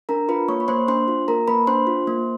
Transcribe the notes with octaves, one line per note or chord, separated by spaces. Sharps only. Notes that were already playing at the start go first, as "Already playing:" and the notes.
D4 A#4 A#5
F4 B4 B5
A#3 C#5 C#6
B5
A#3 C5 C6
D4 C5 C6
F4
A#3 A#4 A#5
A#3 B4 B5
D4 C5 C6
F4
A#3